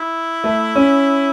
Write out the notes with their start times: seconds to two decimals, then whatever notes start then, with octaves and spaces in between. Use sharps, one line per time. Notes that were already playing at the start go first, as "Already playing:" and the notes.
Already playing: E4
0.44 A3
0.75 C#4